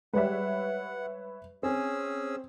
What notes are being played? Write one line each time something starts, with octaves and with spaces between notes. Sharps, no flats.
G3 G#3 B4 C#5 E5 F#5
C4 C#4 G#4 E6